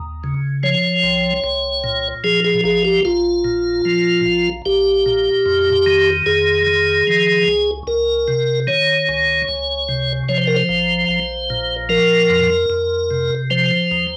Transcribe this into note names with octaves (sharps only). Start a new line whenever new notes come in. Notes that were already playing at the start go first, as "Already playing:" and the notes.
Already playing: D#2
C#3
F3 C#5
C2
C2
A#2
F3 G#4
G#4
A#1 G#4
G4
A#1 F4
A#2
F3
A#1
A#1 G4
A#2
F2
D#3
F2 G#4
D#3
F3
C#2
C#2 A#4
C3
D#3 C#5
C#2
C#2
C3
F3 C#5
C5
A#4
C5
A#1
A#1
A#2
F3 A#4
F2
F2
C3
F3 C5
D#2